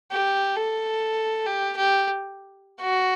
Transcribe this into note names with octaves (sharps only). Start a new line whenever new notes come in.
G4
A4
G4
G4
F#4